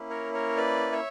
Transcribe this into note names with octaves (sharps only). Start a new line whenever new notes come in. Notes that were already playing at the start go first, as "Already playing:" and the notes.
Already playing: A#3 C#4 E4
A#4 C#5
A#4 C#5
B4 D5
C#5 E5